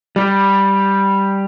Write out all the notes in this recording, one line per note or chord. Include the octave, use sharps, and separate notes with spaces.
G3